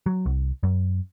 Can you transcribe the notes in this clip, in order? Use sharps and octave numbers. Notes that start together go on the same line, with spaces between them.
F#3
C2
F#2